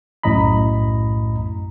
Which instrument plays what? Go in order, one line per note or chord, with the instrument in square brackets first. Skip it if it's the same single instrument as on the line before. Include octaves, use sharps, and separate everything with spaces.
[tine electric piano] B1 F#2 A2 D#5 A#5 B5